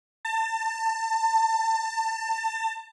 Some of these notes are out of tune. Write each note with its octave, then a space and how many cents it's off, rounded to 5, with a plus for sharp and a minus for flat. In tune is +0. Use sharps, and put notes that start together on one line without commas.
A5 +30